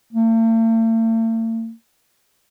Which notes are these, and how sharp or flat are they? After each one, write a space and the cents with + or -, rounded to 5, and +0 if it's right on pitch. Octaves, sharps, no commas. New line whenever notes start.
A3 +45